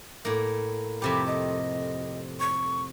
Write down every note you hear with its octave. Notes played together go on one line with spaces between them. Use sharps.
A2 A#3
F2 C3 G4 B5
D#5
C#6